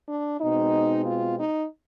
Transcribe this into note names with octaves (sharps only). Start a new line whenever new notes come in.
D4
B2 G#3 C4 D#4
F4
D#4